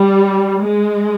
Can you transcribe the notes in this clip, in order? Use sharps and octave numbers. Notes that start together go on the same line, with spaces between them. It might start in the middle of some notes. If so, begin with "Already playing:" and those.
Already playing: G3
G#3